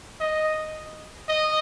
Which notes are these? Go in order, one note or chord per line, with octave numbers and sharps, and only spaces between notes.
D#5
D#5